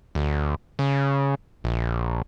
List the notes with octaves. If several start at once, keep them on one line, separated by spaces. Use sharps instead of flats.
D2
C#3
A#1